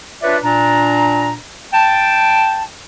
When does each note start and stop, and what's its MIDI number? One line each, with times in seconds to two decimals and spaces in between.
0.22 0.37 62
0.22 0.37 65
0.22 0.37 71
0.22 0.37 73
0.22 0.37 74
0.22 0.37 76
0.44 1.34 46
0.44 1.34 62
0.44 1.34 82
1.72 2.63 79
1.72 2.63 81